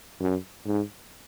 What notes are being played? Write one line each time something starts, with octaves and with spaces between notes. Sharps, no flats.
F#2
G#2